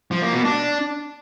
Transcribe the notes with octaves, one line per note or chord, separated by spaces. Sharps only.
F3
A#3
B2
D4